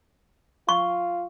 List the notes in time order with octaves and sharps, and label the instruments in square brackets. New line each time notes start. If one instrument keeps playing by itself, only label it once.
[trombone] F4 [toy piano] C#6